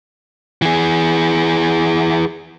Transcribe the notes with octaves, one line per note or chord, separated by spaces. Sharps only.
E3 G#4